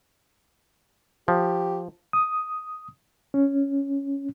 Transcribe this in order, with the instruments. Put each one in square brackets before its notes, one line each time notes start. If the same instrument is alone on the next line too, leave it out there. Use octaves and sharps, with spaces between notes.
[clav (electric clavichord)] F3 [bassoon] G4
[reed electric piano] D#6
C#4